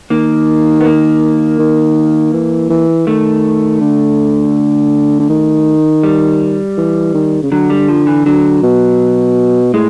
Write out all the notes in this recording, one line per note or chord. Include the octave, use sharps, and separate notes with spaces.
D#3 A#3
B3
A#3
D#3
E3
E3
D#3 A3
D3
D3
D#3
G3
E3
D#3
C#3
D3 F#3
G3
F3
E3
D3 F#3
B2
A2 G#3